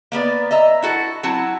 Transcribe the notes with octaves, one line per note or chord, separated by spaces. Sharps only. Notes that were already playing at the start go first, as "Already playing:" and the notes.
A#3 B3 B4 D5
D#5 E5 A#5
E4 F#4 A4
F#3 C4 E4 F#4 A5